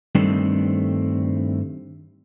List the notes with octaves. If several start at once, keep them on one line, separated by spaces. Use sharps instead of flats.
G2 D#3 G3 A3 C4 D4